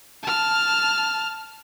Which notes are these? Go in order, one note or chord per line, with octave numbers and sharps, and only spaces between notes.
A5 F6